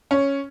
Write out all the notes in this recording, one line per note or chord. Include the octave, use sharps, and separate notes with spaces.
C#4